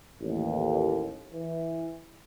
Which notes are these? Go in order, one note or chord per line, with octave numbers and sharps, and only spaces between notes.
A1 D#2
E3